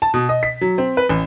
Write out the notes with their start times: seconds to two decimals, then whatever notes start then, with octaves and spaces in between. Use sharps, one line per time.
0.02 A5
0.14 B2
0.29 D#5
0.43 B6
0.61 F#3
0.78 C4
0.97 B4
1.09 A1